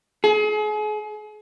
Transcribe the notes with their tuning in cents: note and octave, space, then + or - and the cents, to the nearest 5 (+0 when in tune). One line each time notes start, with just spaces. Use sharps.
G#4 +35